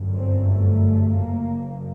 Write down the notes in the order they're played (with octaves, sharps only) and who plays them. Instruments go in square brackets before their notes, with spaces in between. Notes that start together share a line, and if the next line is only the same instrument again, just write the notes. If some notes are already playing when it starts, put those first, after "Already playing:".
Already playing: [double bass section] G1 F#2
C4
A3
F#1 F#2 A#3